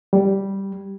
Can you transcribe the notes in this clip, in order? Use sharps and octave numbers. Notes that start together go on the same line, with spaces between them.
G3